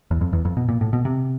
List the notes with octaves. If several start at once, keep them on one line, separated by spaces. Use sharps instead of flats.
E2
F2
E2
F2
B2
A#2
A2
B2
C3